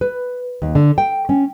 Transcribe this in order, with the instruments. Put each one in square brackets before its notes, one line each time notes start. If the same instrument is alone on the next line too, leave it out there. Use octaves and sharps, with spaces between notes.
[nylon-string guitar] B4
D#2
D3
G5
C#4